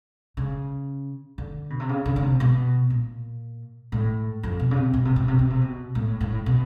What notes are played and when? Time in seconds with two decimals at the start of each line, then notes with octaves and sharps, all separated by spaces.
0.37 C#3
1.38 D3
1.70 B2
1.80 C3
1.89 C#3
2.06 C#3
2.16 C#3
2.23 C3
2.40 B2
2.90 A#2
3.92 A2
4.43 F2
4.60 B2
4.71 C#3
4.77 C3
4.93 B2
5.05 C3
5.16 B2
5.28 C3
5.39 B2
5.50 C3
5.61 B2
5.95 A2
6.20 A2
6.46 B2